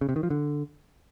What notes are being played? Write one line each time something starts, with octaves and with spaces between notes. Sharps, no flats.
C#3
C3
D#3
F3
D3